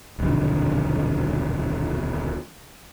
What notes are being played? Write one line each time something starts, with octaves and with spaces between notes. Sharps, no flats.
D#1 B1 F2 D3